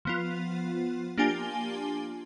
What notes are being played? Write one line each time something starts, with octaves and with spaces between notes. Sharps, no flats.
F3 B3 F4
A#3 D4 F4 G4 G#5 G7